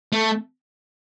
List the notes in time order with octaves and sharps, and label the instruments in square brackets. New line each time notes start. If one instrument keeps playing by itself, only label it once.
[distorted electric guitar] A3